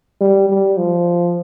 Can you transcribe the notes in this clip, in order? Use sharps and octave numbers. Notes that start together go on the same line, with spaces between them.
G3
G3
F3